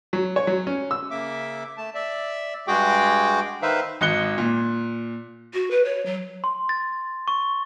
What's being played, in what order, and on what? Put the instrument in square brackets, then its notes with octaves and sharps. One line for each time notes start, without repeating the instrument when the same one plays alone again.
[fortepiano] F#3
C#5
F#3
C#4
E6
[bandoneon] C#3 A#3 E5 D6
A3 A5
D5 E5
G2 G#3 F#4 G#4 G5 D6
D#3 D#4 B4 C5 E5 F5
[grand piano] G#1 D#5 F#6 C#7 G7
A#2
[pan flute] F#4
B4
C#5
F#3
[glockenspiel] C6
A6
C#6